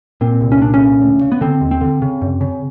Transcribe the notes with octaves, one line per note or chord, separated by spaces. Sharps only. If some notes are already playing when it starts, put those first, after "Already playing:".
A#2 C4
C2
C#4
A#2 D4
C#4
C#3
D2
C#3
B3
D3 C4
D#2
C4
D3
C#3
F#2
C#3